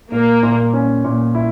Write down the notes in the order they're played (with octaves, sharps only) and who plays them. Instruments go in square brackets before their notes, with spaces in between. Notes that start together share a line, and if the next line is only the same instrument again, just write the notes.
[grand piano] A#2 [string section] A#3
[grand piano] A#2
C#4
A#2
E4